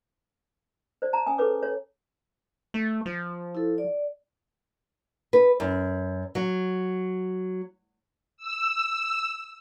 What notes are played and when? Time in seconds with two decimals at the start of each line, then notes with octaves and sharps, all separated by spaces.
1.02 C5 D5
1.13 A5 A#5
1.27 C#4 G#5 D#6
1.38 G#4 A4 B4 C#5 D6
1.63 C#5
2.74 A3
3.06 F3
3.55 E4 A4
3.78 D5
5.33 B4
5.60 F#2
6.35 F#3
8.37 E6